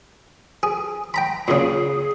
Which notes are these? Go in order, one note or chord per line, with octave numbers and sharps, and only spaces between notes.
G#4
G5 A#5 B5
A#2 C#3 G#4